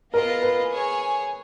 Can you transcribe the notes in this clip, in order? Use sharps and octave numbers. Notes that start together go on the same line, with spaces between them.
B3 F4 G#4 A#4 D#5
B4
G#4 C#5 G#5